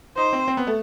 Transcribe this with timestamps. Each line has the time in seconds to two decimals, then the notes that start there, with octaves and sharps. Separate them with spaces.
0.17 D#4 C5
0.33 C4
0.48 C4
0.57 B3
0.67 A3